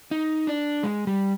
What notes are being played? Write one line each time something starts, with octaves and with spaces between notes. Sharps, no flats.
D#4
D4
G#3
G3